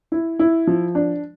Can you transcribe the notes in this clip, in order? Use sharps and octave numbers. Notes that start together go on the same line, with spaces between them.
E4
E4
F3
D4